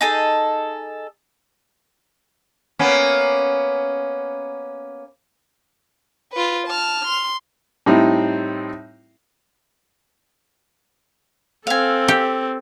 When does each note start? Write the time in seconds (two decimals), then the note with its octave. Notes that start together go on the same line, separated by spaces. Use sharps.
0.01 D#4 G#4 A4
2.79 A#3 B3 C#4
6.33 F4 B4
6.67 A5 F6
7.07 C6
7.86 A2 G3 C4 D#4 E4
11.67 C4 A4 F5 G#5
12.08 G4